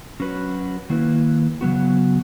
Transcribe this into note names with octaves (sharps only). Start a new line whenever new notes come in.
F#3 C#4 F#4 B4
D#3 A#3 E4 B4
C#3 F#3 B3 F#4